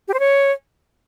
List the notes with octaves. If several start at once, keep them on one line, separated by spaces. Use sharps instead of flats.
G4
C5
C#5